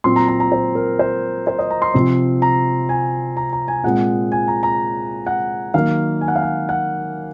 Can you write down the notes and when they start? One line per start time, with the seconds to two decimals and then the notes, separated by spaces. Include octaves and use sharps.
0.04 A#2 F#3 C4 C6
0.16 A#5
0.28 A#5
0.40 A#5
0.52 C5
0.75 A#4
0.99 C5
1.47 C5
1.59 D#5
1.71 A#5
1.82 C6
1.94 C3 F3 C4
2.42 A#5
2.89 G#5
3.37 A#5
3.53 A#5
3.68 G#5
3.83 A#2 G#3 C4 F#5
4.32 G#5
4.48 A#5
4.63 A#5
5.27 F#5
5.74 D#3 F#3 A#3 F5
6.21 G#5
6.28 F#5
6.36 F5
6.43 F#5
6.69 F#5